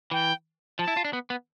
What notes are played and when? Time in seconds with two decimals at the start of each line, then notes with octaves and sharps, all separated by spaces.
0.11 E3 G5
0.79 F3 A5
0.88 E4
0.97 F4
1.05 D4
1.13 B3
1.30 B3